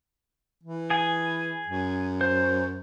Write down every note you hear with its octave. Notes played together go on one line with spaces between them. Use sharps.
E3
G#4 G#5
F#2
C5